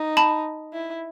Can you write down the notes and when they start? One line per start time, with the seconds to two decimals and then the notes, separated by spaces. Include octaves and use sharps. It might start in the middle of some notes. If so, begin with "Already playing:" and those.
Already playing: D#4
0.17 A5 B5
0.73 E4